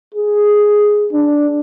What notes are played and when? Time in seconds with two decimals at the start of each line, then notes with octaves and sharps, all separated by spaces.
0.14 G#4
1.13 D4